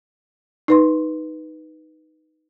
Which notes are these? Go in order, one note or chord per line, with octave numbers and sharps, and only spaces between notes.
D#4 B4 C6